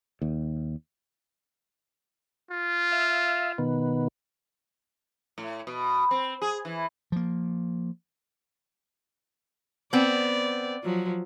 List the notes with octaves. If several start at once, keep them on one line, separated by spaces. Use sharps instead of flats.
D#2
F4
E5 F5
B2 D#3 B3
A2
B2
C4
G#4
E3
F3 A#3
B3 C4 D5
F3 F#3